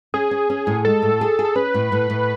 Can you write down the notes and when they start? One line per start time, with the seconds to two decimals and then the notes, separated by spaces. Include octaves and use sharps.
0.14 C#4 G#4
0.31 C#4
0.50 C#4
0.67 A2
0.85 G#3 A4
1.02 A2
1.21 G#4
1.39 G#4
1.45 A4
1.55 C#4 B4
1.74 A2
1.92 A2
2.10 A2